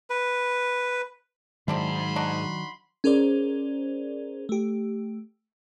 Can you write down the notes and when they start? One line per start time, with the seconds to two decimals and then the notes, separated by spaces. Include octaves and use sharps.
0.10 B4
1.68 G#2 D#3 F#3 C4 D4 E4 B5 C6
2.16 D4 D#4 F#4
3.04 C#4 G#4 A#4 C5 D5
4.49 A3 G4